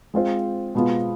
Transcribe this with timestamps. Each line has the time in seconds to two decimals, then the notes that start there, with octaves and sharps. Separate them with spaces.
0.14 G#3 C4 F4 C5
0.75 B2 G#3 B3 F4